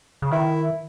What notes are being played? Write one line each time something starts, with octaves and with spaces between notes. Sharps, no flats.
C#3
D#3 E4